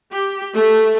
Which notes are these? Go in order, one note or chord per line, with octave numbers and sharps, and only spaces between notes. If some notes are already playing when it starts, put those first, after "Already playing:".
G4
A3